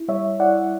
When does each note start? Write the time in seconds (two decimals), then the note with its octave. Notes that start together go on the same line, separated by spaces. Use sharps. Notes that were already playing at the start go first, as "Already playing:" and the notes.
Already playing: E4
0.08 G3 C#5 E5
0.40 E4 D5 F#5